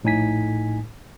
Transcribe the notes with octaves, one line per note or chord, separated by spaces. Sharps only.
A#1 A2 D#4 G#5 B6